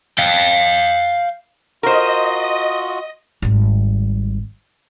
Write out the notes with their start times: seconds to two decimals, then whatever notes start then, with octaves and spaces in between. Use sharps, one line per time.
0.18 F5 G5
1.83 F4 F#4 A#4 C5 D#5
3.42 G#1 G3